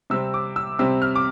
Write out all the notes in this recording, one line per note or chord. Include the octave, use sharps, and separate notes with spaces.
C3 G3 C4 E6
D6
E6
C3 G3 C4 E6
F6
D6